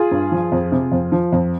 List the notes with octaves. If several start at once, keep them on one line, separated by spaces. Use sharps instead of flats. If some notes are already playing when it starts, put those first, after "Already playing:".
Already playing: F4 G#4
G2
F3
F2
C3
F2
F3
F2